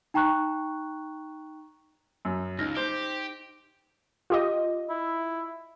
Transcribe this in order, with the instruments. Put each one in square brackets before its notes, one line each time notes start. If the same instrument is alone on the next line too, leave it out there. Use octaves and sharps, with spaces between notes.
[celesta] D#4 G5 A#5 C#6 F#6
[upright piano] F#2
[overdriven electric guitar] C#2 [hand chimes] D#4 A#6 [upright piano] F6
[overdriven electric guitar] G4 [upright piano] C5 G6
[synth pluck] F4 G4 D#5
[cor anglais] E4